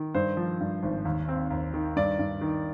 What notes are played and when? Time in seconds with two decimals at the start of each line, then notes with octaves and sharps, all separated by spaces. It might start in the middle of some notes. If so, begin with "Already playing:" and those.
Already playing: D#3
0.15 G2 C5
0.37 F3
0.60 G2
0.83 G#1
1.05 D#2
1.28 C4
1.51 D#2
1.74 D#3
1.96 G2 D5
2.19 G2
2.41 D#3